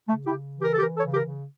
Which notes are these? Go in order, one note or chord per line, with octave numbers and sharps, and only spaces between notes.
C#3 A3
E4 G4
C#3
E3
G4 A#4
A4
E3 G4 A#4
A4 C#5
C#3
G4 A#4
C#3